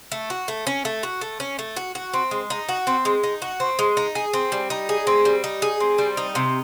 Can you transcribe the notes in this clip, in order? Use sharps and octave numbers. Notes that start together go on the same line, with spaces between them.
A3
F#4
A3
C#4
A3
F#4
A3
C#4
A3
F#4
F#4
C4
G#3
D#4
F#4
C4
G#3
D#4
F#4
C4
G#3
D#4
G#4
C4
G3
D#4
G#4
C4
G3
D#4
G#4
C4
G3
D#4
C3